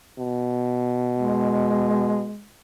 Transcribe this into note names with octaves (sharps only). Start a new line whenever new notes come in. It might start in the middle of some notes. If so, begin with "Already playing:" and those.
B2
G#3